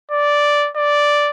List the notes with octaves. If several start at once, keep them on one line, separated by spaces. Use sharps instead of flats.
D5
D5